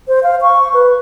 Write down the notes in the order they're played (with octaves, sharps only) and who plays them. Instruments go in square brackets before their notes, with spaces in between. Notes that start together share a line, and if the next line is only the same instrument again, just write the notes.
[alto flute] C5
F5
C#6
B4